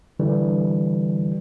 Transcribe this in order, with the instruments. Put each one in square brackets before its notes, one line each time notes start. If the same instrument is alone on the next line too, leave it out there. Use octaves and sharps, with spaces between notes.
[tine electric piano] D3 E3 G3